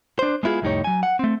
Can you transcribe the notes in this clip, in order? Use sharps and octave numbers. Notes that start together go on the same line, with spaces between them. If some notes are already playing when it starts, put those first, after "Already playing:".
D4 C5
G#3 B3 E4 F4 G#4
C2 F2 A2 D#4 G4 C#5
F#3 G#5
F#5
A3 C4